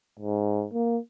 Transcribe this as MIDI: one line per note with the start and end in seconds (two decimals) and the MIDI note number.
0.20 0.65 44
0.73 0.98 58